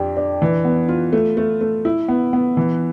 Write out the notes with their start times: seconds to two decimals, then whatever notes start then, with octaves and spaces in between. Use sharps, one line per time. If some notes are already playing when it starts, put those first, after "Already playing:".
Already playing: F2 D4 G4
0.17 D4
0.42 E3
0.65 B3
0.89 F4
1.13 A3
1.37 A3
1.61 A3
1.85 E4
2.08 B3
2.33 B3
2.57 E3